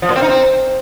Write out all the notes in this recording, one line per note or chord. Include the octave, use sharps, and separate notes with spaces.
F3
A#2
C4
D#4
C4